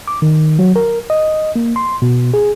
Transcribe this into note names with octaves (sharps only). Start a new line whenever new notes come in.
D6
D#3
F#3
A#4
D#5
A#3
C6
B2
G#4